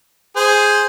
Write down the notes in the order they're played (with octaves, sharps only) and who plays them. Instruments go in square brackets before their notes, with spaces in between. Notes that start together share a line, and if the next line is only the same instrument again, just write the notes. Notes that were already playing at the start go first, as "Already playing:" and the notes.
[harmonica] G#4 C5